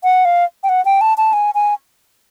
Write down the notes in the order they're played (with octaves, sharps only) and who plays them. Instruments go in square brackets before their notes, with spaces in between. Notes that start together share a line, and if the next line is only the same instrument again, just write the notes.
[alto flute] F#5
F5
G5
F#5
G5
A5
A5
G#5
G#5